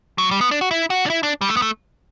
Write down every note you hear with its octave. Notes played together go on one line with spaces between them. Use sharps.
F#3
G3
B3
D4
F#4
E4
F#4
D4
E4
D4
G3
A3
B3
A3